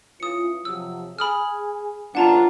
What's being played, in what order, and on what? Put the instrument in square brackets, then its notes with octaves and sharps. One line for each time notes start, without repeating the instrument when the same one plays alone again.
[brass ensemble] E3 C#4 F4 [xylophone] D#6 C#7
[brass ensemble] C3 F3 F#3 [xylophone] E6
[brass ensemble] G#4 G#5 [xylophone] B5 D#6 F6
[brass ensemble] B1 [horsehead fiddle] D4 F4 [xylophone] F#5 A5 A#5